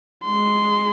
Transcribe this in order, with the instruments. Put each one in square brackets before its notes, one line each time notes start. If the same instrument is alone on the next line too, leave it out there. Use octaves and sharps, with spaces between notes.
[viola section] G#3 [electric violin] C6